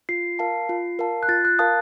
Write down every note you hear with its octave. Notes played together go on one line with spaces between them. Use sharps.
F4 C7
A#4 F5 A5
F4
A#4 F5 A5
F#6
F4 A6
F#6
A#4 F5 A5 D#6